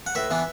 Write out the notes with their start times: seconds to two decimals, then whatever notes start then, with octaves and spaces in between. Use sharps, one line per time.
0.06 F#5
0.15 A2 B4 E5
0.31 E3 B3 D4